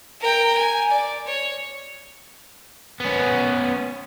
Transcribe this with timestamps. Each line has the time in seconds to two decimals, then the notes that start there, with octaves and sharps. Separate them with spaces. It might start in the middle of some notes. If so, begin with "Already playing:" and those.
0.21 A#4 G5
0.57 G#5
0.90 D5
1.26 C#5
3.00 B3 C#4